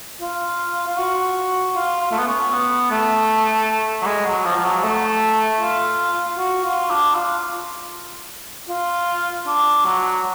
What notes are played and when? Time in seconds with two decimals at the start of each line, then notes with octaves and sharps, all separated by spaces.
0.21 F4
0.87 F4
0.98 F#4
1.75 F4
2.01 F4
2.12 A3
2.19 B3
2.27 C#4
2.52 B3
2.91 A3
4.02 F#3
4.06 G#3
4.26 F#3
4.45 F3
4.56 F3
4.65 F#3
4.84 A3
5.60 F4
6.37 F#4
6.64 F4
6.90 D4
7.15 F4
8.69 F4
9.47 D4
9.85 F#3